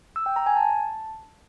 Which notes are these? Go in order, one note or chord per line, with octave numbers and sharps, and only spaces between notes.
E6
G5
A#5
G#5
A5